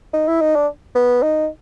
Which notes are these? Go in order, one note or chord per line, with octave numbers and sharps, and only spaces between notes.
D#4
E4
D#4
D4
B3
D#4